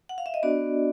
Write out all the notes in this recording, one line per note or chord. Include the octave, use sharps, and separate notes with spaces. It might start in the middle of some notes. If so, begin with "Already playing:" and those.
F#5
F5
E5
D#5
B3 D4 F#4 D5